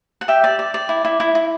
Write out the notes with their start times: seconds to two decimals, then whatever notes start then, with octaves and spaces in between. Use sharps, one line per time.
0.21 F#5
0.28 G4 E5 G5
0.44 D5
0.59 D5
0.74 D5
0.89 E4
1.05 E4
1.20 E4
1.35 E4